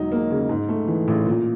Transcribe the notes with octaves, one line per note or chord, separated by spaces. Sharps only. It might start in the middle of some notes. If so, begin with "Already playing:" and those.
Already playing: E1 F#3 D#4
A#3
C#3
G#2
A3
E3
A1
A#2